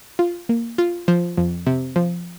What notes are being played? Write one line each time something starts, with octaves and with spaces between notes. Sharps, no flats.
F4
A#3
F4
F3
F2
C3
F3